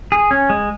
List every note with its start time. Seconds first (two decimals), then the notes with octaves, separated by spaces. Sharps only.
0.12 G#4
0.31 C#4
0.50 G#3